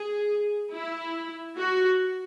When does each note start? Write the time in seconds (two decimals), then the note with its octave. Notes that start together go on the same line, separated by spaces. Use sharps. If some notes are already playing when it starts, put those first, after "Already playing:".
Already playing: G#4
0.72 E4
1.57 F#4